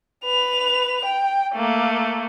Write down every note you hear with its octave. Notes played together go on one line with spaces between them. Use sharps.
B4 F7
G5
A3 A#3